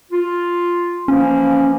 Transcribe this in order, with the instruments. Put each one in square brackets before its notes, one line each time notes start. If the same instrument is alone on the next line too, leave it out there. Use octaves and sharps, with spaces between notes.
[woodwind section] F4
[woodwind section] E3 F3 A#3 [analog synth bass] C#4